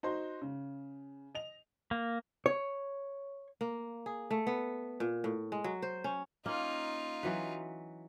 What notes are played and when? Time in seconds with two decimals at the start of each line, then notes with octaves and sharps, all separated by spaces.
0.03 D#4 F#4 C5 C6
0.42 C#3
1.35 D#5 F7
1.91 A#3
2.46 C#5
3.61 A#3
4.06 G#4
4.31 A3
4.47 B3
5.00 A#2
5.24 A2
5.52 G#3
5.64 F#3
5.82 C5
6.04 C#4
6.46 A#3 C#4 D#4 F4
7.23 E3 F#3 B4